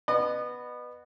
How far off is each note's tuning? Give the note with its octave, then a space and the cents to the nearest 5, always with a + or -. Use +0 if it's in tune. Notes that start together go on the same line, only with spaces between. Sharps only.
B3 +0 D#5 -35